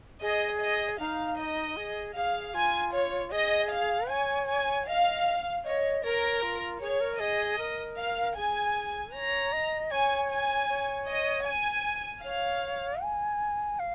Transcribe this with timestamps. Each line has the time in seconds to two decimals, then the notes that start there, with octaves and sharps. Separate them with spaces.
0.22 G#4 D#5
0.60 D#5
0.99 D#4 F5
1.38 D#5
1.77 G#4
2.15 G#4 F5
2.54 F4 G#5
2.94 C#5
3.32 G#4 D#5
3.71 F5
4.10 C#5 G#5
4.48 G#5
4.87 D#5 F5
5.64 C#5 D#5
6.04 A#4 C#5
6.42 F4
6.81 G#4 C#5
7.01 A#4
7.19 G#4 D#5
7.58 A#4
7.98 F5
8.36 G#4 G#5
9.14 C#5 A#5
9.53 D#5
9.91 C#5 G#5
10.30 G#5
10.69 C#5
11.08 D#5
11.46 G#5
12.24 C#5 F5
13.02 G#5
13.79 F5